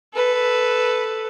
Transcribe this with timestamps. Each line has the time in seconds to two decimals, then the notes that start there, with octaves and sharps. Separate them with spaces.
0.14 A4 B4